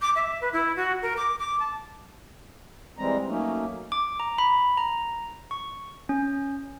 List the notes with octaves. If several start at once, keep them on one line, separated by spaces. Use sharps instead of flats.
D6
E5
B4
E4
F#4
A#4
D6
D6
A5
E3 G3 G#3 C4 A#5
F#3 A3 A#3 C#4 D#4
D6
A#5
B5
A#5
C#6
C#4